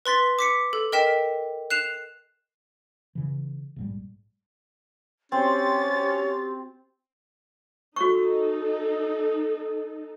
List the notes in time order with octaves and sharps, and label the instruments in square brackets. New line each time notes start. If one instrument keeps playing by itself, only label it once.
[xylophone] B4 C6 A6 B6
D6 B6 C#7
A4
A#4 D#5 G5 B6 E7
F#6 C7 E7 F7
[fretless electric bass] C#3 E3
A#1 G#2 G3
[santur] C4 [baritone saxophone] C#4 [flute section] F#4 G4 C6 [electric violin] A6
[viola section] D#4 A4 [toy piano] F#4 C#6